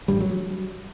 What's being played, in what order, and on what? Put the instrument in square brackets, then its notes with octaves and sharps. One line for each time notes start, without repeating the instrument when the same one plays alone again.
[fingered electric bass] A1 G2 G3
F#3